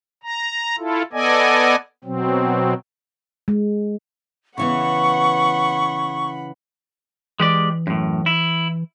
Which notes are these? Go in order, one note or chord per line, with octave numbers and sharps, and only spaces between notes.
A#5
E4 F4 A4
B3 A4 D5 D#5 G#5
B2 F#3 C4
G#3
C#3 E3 B3 F#5 B5 C#6
E3 G#3 G4 D5
F#2 A2
E4